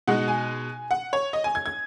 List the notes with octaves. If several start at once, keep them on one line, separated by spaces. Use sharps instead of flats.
B2 G#3 D#4 F#5
G#5
F#5
C#5
D#5
G#5
G#6
G#6